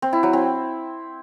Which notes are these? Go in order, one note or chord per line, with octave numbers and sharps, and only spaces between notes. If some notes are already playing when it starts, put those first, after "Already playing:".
C4
E4
F#3
C4